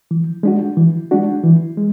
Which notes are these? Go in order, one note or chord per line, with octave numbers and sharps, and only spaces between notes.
E3
G#3 D4 F#4
E3
G#3 D4 F#4
E3
G#3